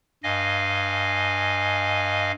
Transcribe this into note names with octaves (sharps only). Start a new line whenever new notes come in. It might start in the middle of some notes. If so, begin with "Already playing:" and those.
G2 D#5 F5 G#5